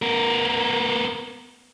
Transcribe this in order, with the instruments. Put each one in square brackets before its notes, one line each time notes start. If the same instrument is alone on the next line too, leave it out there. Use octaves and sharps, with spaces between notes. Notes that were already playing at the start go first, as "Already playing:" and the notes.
[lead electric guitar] B3 A#4